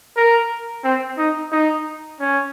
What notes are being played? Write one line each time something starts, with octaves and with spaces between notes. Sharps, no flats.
A#4
C4
D#4
D#4
C#4